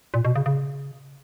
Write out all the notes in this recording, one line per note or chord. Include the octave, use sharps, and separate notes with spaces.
A#2
B2
C#3
C#3